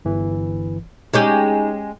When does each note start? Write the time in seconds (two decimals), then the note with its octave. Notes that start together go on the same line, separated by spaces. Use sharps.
0.05 G1 E3
1.13 G#3 C#4 D#4 G4